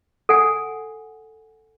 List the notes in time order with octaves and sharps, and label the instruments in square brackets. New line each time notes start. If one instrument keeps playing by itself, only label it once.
[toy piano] A4 F#5 G#5